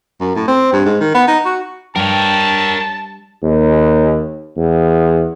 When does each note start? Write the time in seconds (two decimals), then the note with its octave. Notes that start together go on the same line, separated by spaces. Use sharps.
0.20 F#2
0.36 A2
0.48 C4
0.73 G2
0.86 G#2
1.01 D#3
1.15 B3
1.28 D#4
1.45 F#4
1.96 G2 A#4 C#5 G5 A5
3.42 D#2
4.57 E2